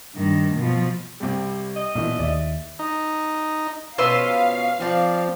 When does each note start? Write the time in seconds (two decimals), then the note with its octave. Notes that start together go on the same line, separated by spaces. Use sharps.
0.15 G2 D#3
0.55 B2 F3
1.20 C2 C3 G3
1.76 D#5
1.95 B1 A#2 E3
2.19 D#2 D5 E5
2.79 D#4
3.98 B2 F3 C#4 B4 F5 C6 E6
4.80 F3 C4 D5